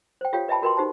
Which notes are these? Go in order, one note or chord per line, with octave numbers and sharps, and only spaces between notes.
C5 G5
F4 G4 A4 C#5 F5 G5
B4 D#5 E5 G5 A5 B5
F#4 A#4 B4 D#5 G5 C6
D#4 G4 C5 A5